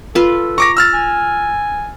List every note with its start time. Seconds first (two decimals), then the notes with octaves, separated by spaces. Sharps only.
0.15 F4 A4 B4
0.58 A#5 C#6 D6 A#6
0.77 E6 F6 A6
0.94 G#5